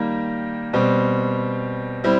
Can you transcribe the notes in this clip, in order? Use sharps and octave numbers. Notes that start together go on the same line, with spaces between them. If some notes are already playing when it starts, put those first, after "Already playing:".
Already playing: D#3 G3 A#3
B2 G3 C4
G3 C4 E4